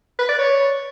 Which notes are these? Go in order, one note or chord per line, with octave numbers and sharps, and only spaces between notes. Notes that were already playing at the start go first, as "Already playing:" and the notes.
B4
D5
C#5